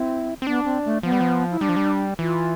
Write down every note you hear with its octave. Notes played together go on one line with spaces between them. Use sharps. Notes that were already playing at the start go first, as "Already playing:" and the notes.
Already playing: C4 E4
C4
B3 D4
C4
A3
F3 B3
G3
F3
E4
G3 D4
F3
G3
E3 F4